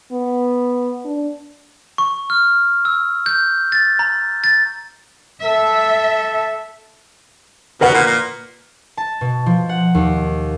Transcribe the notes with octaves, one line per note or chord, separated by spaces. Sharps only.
B3
D4
C#6
F6
E6
G6
A6
A#5
A6
A4 E5
B2 A#4 B4 F#5
A#2
A#2
A5
B2
F3
F#5
D#2